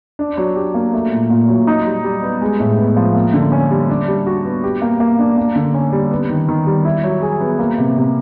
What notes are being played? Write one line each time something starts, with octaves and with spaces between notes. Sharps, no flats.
D4
F#3
G4
A#3
A3
A#2
A#2
F#3
D#4
G3
G3
B3
G#3
A2
B3
F3
A#3
D3
C#4
G3
D4
G3
F#4
B3
G4
A#3
A#3
D4
A#3
D3
C#4
G3
B3
D#3
D#3
G3
E4
F#3
G#4
B3
A#3
C3
C3